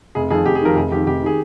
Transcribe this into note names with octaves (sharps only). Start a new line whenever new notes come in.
F1 G#4
F2 D#3 G#4
F1 G4
G#4
F2 D#3 A#4
F1 G#4
F2 D#3 G4
F1 G4
D#3 G#4